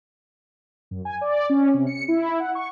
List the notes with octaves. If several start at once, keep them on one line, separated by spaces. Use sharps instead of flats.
F#2
G#5
D5
C#4
C3
C#7
E4
F#5
C#6